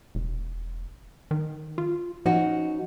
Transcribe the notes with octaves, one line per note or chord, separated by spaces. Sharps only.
E1
D#3
F4
F3 C#4 D#4 F#4